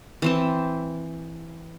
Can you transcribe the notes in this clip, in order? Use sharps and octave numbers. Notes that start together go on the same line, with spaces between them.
E3 C4 A5